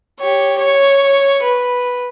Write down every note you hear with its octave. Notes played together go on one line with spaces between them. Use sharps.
G4 C#5
C#5
B4